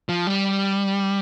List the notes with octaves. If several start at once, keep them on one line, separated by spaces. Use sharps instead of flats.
F3
G3